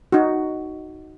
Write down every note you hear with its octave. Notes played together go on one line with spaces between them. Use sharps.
D#4 F#4